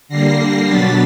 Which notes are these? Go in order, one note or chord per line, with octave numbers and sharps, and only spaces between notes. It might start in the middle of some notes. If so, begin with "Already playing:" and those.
D3 G3 A#3 A#6 C7
B2 F#3 B3 D4 A6 B6